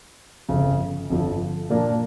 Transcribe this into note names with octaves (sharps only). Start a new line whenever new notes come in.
G1 F2 C#3
G1 F2 D3 F3
A#2 F3 A#3 D4